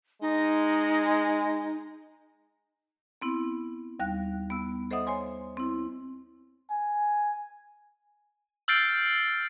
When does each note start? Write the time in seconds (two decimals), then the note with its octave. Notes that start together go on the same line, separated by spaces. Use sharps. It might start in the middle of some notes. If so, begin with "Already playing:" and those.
0.21 G#3 D#4
3.22 B3 C4 E4
3.99 D#2 G3 F5 F#6
4.50 B3 E6
4.91 A4 C5 D#5 E5 F#5 D#6
5.07 C5 C#5 G#5 C6
5.57 C4 E4
6.70 G#5
8.68 E6 F6 G6 A6 C7 D7